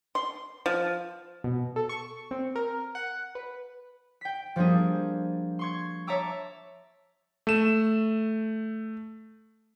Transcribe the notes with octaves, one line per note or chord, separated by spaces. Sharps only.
C6
F3
B2
A4
C#6
C4
A#4
F#5
B4
G5 B6
F3 G3 A#3 D4 G#4
C6 C#6 G#6
C#5 E5 A5 A#5 D6 E6
A3 E7